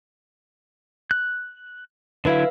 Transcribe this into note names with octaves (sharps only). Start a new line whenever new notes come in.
F#6
D3 F#3 E4 B4 E5 F5